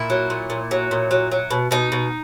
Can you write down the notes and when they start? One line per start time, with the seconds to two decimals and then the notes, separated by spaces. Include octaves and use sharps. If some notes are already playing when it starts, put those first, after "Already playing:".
Already playing: A#2 E4
0.10 F#3
0.30 A#2
0.50 A#2
0.71 F#3
0.91 A#2
1.11 F#3
1.32 F#3
1.50 B2
1.71 B2 D#4
1.92 B2